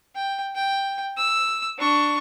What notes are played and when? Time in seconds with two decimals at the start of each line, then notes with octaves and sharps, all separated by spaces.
0.15 G5
0.55 G5
1.17 E6
1.79 D4 C#6